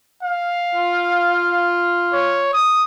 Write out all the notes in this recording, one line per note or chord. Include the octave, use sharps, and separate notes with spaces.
F5
F4
C#5
D#6